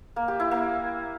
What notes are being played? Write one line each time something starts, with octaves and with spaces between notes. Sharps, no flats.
A#3
G4
E4
A#3